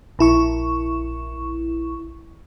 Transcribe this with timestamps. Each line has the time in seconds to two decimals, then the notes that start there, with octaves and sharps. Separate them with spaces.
0.19 A#1 E4 C#6